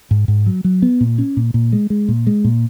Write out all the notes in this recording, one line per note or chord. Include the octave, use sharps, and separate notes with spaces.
G#2
G#2
F#3
F#3
B3
A#2
C#4
A#2
A#2
G#3
G#3
A#2
G#3
A#2